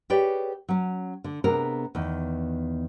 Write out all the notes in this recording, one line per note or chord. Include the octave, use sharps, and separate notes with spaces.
G4 G#4 B4 C#5 D5 G5
F#3 C#4
D3
C3 B3 D4 G#4 A#4
E2 D#3